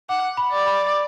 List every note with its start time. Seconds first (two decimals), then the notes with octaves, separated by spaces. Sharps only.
0.09 F#5 D6
0.37 B5
0.52 D5
0.66 B5